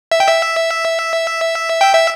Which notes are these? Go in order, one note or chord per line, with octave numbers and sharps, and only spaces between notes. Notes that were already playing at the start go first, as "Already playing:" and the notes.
E5
G5
E5
G5
E5